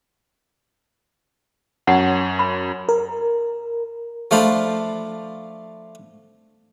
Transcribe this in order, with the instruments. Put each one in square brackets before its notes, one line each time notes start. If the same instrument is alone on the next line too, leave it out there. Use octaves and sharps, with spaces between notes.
[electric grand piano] F#2 C#5 A5 [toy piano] F#5
[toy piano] B5
[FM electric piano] A#4
[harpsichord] F3 A3 D4 C5 F5 B5